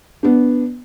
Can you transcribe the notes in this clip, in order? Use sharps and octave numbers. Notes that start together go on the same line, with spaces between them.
B3 D4